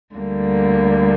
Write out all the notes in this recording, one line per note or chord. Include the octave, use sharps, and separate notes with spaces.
D2 D3 G3 A#3